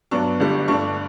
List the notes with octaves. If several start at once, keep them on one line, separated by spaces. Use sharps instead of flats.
G2 F#3 B3 D4 C#6
G1 G2 D3 G3
G2 D3 A3 D4 C#6